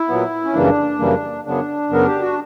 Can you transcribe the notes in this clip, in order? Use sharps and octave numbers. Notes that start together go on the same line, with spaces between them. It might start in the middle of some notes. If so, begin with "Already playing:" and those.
Already playing: E4
A#2 F#3 B3
C#4
F#2 C#3 E3 G3 A#3 D4
F#2 C#3 E3 G3 A#3
F#2 C#3 F#3 B3 D4
F#2 C#3 F#3 B3 A#4
G4
F#4